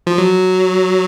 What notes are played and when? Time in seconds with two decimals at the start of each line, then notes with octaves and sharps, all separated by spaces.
0.07 F3
0.18 F#3